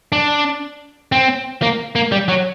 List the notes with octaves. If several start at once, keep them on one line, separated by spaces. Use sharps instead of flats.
D4
C4
A#3
A#3
G3
F#3